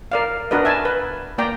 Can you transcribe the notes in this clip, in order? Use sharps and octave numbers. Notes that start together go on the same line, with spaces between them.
A#4 D5 F5
D4 F#4 A#4 B4 D#5
E5 G#5 A5
B4
A#3 D5 G5 A#5